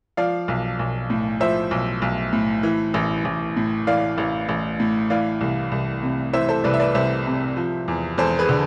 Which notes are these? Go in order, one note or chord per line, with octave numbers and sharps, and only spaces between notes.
F3 D5 F5
B1
B1
A2
F3 C5 E5
B1
B1
A2
E3
A1
A1
A2
E3 D5 F5
A1
A1
A2
E3 D5 F5
C2
C2
C3
E3 C5 E5
A4 C5
C2 B4 D5
E5
B4 D5
C2 C5 E5
C3
F3
E2
E2 A4 C5
G#4 B4
D3